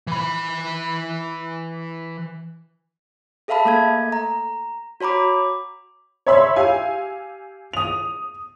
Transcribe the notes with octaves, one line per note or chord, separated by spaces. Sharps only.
E3 B5
G#4 A4 E5 F5 A5 B5
A3 A#3 A4 G#6
A#5
F#4 C#5 A#5 B5 D6
C#5 E5 B5 C6 E6
G4 F5 G#5
D#6 F7